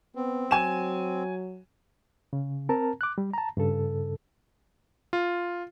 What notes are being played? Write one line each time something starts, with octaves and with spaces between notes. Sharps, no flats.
B3 C4
F#3 G#5 E7
C#3
C4 A#4 A5 A#5
D6 F#6
G3
A5 A#5
G2 C#3 A4
F4